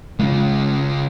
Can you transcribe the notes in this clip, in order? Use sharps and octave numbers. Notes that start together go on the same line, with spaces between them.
C#3 G#3 B3 C#4 F4